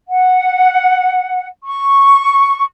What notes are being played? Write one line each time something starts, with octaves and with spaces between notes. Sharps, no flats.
F#5
C#6